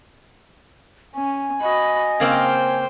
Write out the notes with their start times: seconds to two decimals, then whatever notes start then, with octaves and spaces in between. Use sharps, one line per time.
1.15 C#4 G#5
1.61 F#4 D#5 B5
2.20 C#3 A#3 C4 C5 G5